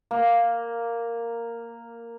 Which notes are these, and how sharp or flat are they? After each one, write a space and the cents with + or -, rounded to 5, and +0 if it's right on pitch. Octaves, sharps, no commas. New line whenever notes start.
A#3 -5